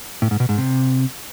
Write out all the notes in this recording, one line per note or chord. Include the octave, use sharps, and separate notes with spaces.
A2
G#2
B2
G#2
C3